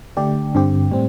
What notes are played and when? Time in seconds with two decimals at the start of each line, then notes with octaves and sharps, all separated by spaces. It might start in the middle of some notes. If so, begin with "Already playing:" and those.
0.17 D3 A3 D4 G4 D5
0.55 G2 D3 C4 G4
0.91 A2 G3 C4